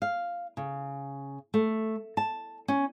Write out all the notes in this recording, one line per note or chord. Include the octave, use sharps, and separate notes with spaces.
F5
C#3
A3
A5
C#4